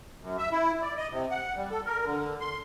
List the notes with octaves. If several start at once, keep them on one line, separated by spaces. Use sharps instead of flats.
F#2
E5
E4
D5
D#5
C3
F#5
G3
A4
A#4
D3
C6